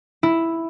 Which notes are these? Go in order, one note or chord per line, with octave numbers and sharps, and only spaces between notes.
E4